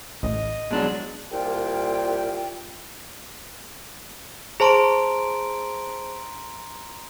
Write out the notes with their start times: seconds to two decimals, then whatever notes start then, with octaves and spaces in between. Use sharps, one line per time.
0.23 A1 D#5
0.71 B2 F#3 G#3 D4
1.32 C2 A#2 F4 G5
4.60 G#4 C5 A5 A#5 C6 D7